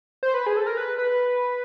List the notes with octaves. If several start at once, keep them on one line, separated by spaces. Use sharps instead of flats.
C5
B4
G#4
A4
A#4
B4
B4